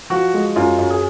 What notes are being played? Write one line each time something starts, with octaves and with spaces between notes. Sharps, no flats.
F3 F#4
G#3
F#2 F4
F#2
G#4